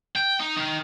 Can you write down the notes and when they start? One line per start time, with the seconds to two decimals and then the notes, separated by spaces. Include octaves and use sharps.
0.16 G5
0.40 D#4
0.57 D#3